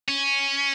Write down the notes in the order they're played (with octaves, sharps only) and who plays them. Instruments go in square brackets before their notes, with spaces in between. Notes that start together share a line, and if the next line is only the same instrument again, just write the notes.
[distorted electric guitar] C#4